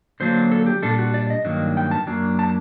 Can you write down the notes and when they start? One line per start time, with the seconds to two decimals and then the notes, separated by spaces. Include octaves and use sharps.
0.20 D3 F#3 A#3 D4 C5
0.51 A4
0.67 G4
0.82 A#2 G3 D4 A4
0.99 F#4
1.14 D5
1.30 D#5
1.45 G2 D#3 F#3 A#3 D4
1.77 G5
1.91 A5
2.07 F#2 F#3 A#3 D4
2.39 A5